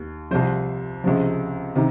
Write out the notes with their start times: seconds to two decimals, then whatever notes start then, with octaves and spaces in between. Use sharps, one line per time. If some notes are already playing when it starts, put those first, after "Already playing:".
Already playing: D#2
0.31 C2 C3 F3 C5
1.04 C#2 C3 F3
1.75 C3 D#3